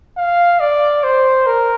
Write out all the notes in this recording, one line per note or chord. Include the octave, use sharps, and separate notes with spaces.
F5
D5
C5
A#4